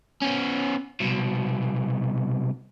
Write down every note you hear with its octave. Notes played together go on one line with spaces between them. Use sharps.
B3 C#4
C2 B2